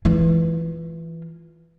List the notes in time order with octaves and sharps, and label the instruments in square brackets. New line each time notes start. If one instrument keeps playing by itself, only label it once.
[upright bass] E3 F4